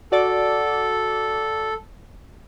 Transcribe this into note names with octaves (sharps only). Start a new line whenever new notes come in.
F#4 A4 D5 D6